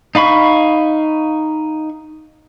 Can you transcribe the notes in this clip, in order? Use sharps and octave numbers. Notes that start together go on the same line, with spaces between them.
D#4 F5 B5 C#6